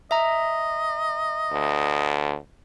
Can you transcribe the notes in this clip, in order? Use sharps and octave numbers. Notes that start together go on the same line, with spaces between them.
D#5 E5 A#5
D2